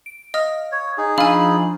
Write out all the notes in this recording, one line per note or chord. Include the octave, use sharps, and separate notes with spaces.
D7
D#5 F5 D#6 F6
C#5
D#4 G#4
F3 D4 F5 G#5 B5 C#6 E6 F6